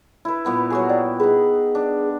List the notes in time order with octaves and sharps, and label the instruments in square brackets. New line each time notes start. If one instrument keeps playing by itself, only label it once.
[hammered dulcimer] E4 B4
A#2 B3 A#4
F#3 F#4 G#4
[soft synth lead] D5 [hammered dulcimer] G5
[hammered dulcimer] D#4 B4 [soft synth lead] G#4
[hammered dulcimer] D4